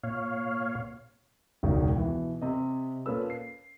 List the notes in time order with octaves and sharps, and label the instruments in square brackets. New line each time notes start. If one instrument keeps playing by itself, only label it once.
[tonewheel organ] A#2 C#5 F5
[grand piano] E1 C#2 D#3
B2 E3
C3 D#5
A#2 A#3 C#4 A4 B4 E6
C7